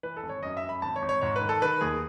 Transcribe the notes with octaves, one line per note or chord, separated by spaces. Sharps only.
E3 B4
A4
G#1
C#5
F#2 D#5
E5
F#2
B5
G#1 A5
C#5
G#1
C#5
G#2 C#5
B4
D#3
A4
D#3 B4
D#2 G#4